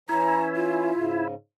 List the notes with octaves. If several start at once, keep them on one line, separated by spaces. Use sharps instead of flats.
E3 C#4 E4 A#5
F4
G#2 C#3